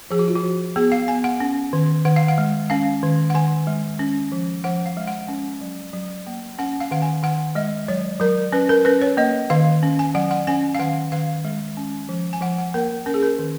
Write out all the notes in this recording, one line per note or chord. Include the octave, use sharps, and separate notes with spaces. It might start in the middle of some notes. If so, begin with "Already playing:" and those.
F3 G#4
F#4
F4
F#4
F3
B3 G#4
F5
B3 G#5
F#5
C#4
D#3
D#3 F#5
F5
F#5
G#3
C#4 F5
D#3
F#5
D#3 G#5
G#3
C#4
F3
F3 F#5
F5
G#3
F#5
C#4
F#3
F#3
A#3
C#4 F#5
F5
D#3 F#5
G#5
D#3 F#5
G#3 D#5
F#3 C#5
F#3 A#4
C#4 B4
A#4
C#4 B4
C#5
A#3 D#5
D#3 F5
C#4
G#5
F#3 F#5
F#5
C#4 G#5
F5
D#3 F#5
D#3 F5
G#3
C#4
F3
G#5
F3 F#5
F#5
A#3 A#4
C#4 A#4
G#4
A#4
D#3